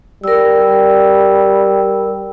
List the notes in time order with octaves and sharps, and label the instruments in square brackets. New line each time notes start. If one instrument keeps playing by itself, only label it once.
[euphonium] G3 [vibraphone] A#4 E6